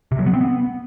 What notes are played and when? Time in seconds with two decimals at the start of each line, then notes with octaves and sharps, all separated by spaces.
0.12 C3
0.19 F#3
0.26 B3
0.34 C4
0.41 B3